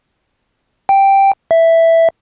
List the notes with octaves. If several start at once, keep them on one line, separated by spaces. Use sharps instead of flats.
G5
E5